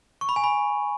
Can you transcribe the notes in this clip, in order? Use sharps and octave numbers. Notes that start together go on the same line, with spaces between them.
C#6
B5
G#5
B5